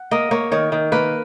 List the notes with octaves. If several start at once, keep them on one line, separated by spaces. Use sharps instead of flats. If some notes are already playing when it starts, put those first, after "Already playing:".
Already playing: F#5
A#3 D#5
A#3 C#5
D#3 C#5
D#3
A#3 B4